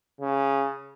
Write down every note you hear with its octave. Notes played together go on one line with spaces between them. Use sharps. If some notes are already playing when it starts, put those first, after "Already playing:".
C#3